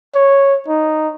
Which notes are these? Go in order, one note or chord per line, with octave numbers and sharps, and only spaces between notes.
C#5
D#4